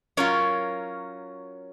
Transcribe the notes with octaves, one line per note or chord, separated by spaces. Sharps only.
F#3 C#4 F4 A#4 C#5